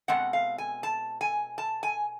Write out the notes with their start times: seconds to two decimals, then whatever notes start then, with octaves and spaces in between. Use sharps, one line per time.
0.08 B2 G#3 C4 F#5
0.33 F5
0.58 G#5
0.83 A5
1.21 G#5
1.58 A5
1.83 G#5